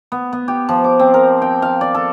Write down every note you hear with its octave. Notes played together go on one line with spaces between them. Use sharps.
B3
B3
G4
F3
D6
C4
A#4
G5
F5
D5
A4